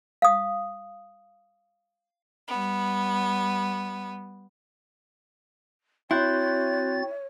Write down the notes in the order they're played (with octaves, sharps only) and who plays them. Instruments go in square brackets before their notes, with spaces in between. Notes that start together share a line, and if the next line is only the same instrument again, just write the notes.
[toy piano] F5 D#6
[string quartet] G3 B3
[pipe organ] C4 F#4 A6 [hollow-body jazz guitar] E4 [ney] C#5 [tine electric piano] C6 F#6 G6